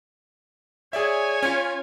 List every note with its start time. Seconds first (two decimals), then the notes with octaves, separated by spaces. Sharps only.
0.93 G#4 C#5 D5 E5 G#5
1.42 C#4 F4